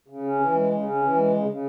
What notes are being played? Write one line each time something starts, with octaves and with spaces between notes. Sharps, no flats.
C#3
C#4
E3
G#3
C#3
C#4
E3
G#3
C#3
C#3